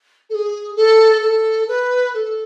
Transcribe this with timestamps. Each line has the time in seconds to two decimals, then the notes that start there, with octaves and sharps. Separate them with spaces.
0.29 A4
0.34 G#4
0.76 A4
1.22 A4
1.68 B4
2.14 A4